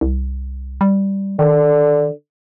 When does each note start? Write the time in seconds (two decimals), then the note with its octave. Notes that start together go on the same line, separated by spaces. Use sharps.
0.01 C2
0.81 G3
1.39 D3 D#3